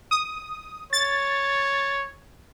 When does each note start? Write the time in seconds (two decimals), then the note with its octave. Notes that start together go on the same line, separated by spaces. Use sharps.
0.11 D#6
0.93 C#5 A6